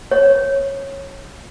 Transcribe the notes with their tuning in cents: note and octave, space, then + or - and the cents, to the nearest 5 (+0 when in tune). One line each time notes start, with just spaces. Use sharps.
C#5 -15